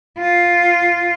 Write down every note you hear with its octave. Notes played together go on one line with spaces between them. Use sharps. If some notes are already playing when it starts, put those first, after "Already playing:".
F4